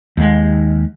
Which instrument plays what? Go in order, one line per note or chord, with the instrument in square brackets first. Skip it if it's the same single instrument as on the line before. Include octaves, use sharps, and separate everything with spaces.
[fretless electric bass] D#2 G#3